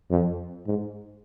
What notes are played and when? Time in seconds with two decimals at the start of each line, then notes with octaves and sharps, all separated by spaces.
0.11 F2
0.67 G#2